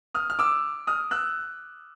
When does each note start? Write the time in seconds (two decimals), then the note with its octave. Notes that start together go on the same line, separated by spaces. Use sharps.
0.14 D#6 F6
0.30 F6
0.39 D6 E6
0.87 D#6 F6
1.11 E6 F#6